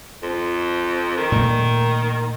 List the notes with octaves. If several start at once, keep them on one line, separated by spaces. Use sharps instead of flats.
F2
D#3
A#2 A3